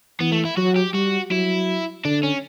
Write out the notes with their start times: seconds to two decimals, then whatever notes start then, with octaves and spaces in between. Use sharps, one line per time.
0.20 E3 B3
0.32 A3
0.45 E4
0.57 F#3 F#4
0.76 G4
0.93 G3 F#4
1.30 F#3 E4
2.05 D3 D4
2.23 C#4